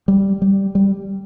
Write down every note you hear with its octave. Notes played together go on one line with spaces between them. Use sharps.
G3
G3
G3